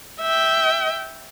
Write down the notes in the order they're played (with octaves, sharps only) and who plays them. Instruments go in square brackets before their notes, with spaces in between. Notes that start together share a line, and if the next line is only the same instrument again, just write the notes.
[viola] E5 G5